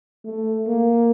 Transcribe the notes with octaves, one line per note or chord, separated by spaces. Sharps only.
A3
A#3